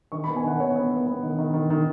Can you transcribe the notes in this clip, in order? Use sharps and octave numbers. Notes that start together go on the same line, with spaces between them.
D#3 C#6
B3 B5
G#5
D#3 F#5
B3 C#5
B3
B3
B3
D#3
D#3
D#3
D#3